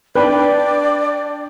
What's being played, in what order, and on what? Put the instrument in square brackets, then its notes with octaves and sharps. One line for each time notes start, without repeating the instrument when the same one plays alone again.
[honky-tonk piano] D4 G5 F#6 [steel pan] B4 [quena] D5